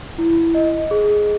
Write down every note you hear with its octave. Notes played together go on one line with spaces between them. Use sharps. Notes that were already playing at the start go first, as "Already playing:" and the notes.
E4
D#5
G#4